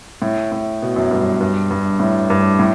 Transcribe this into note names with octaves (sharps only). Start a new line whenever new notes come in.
A2
A2
B2
F#2
G2
G2
G2
A2
G2
A2